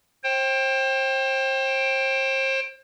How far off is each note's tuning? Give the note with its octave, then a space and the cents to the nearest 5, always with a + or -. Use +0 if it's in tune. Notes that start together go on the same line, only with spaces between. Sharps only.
C5 +35 G5 +0